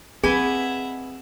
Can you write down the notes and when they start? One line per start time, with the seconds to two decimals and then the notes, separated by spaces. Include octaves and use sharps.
0.24 C4 G#4 B4 D#5 E5 F#5 G#5